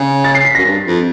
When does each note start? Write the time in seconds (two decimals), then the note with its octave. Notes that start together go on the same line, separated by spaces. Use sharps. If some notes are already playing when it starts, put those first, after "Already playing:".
Already playing: C#3
0.24 A6
0.35 C7
0.45 B6
0.55 F#2 A#6
0.65 G2
0.85 F2